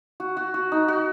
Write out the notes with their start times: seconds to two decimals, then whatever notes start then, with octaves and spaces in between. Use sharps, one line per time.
0.20 F#4
0.37 F#4
0.54 F#4
0.72 D#4
0.88 F#4